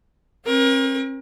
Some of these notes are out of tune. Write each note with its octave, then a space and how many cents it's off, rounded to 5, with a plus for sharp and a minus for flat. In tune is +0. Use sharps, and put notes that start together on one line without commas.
C4 +45 A#4 +30